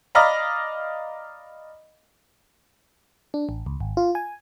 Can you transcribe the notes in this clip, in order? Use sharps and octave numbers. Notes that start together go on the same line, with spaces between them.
D5 D#5 F5 A#5 B5
D4
A1
C#2
G#1
F4
G#5